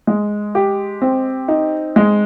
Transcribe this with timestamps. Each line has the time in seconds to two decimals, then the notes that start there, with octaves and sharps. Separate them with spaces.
0.07 G#3
0.55 G4
1.02 C4
1.48 D#4
1.96 G#3